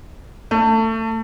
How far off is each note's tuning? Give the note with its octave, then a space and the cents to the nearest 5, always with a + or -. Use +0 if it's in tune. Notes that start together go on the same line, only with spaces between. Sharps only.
A3 +25